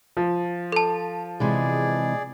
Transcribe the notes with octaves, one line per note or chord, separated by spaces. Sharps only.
F3
A4 A5
C3 E3 G#3 G#4 D5